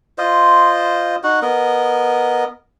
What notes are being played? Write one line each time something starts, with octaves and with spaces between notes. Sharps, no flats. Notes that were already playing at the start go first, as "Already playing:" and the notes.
F4 C5 D#5
D#4 F#4 F#5
B3 A#4 D#5